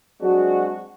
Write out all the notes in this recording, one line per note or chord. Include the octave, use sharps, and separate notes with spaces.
F#3 G#3 C4 D4 F#4